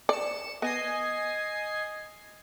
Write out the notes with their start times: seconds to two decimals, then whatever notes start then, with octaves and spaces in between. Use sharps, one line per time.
0.09 D5 C#7 E7
0.62 B3 D#5 G#5 C7